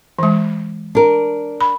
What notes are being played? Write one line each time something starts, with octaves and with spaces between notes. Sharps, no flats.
E3 G#3
D4 A#4
B5